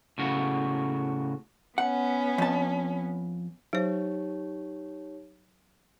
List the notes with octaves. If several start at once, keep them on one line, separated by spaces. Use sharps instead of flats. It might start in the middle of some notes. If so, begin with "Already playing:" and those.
A2 C#3 F#4
B3 C#4 F#5
F2 A5
F#3 D#4 G4 C5 C#5